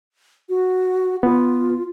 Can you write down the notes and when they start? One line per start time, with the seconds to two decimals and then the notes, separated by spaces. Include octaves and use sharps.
0.49 F#4
1.23 B3 F4